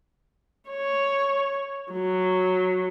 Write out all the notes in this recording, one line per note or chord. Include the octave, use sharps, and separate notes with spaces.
C#5
F#3